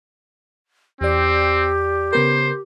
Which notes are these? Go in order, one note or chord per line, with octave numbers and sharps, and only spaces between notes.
E2 C4 G4 D5
C#3 B3 A#4 C5